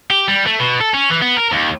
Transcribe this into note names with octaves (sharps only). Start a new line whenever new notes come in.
G4
G3
A3
B2
A4
C#4
E3
B3
A#4
D#2